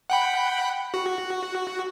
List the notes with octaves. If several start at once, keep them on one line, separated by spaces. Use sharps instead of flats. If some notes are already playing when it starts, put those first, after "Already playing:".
F#5 G5 B5
F#4